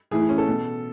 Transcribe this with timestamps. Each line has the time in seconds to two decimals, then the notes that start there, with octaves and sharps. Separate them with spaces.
0.11 A2 E3 G#4
0.20 E4
0.29 C#4
0.38 A4
0.47 B2